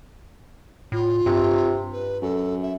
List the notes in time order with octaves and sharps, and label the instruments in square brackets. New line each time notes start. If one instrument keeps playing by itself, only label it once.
[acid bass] A2 [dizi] F4
[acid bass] G2 [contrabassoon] C3
[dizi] B4
[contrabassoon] F#2 [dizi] A4
[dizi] E5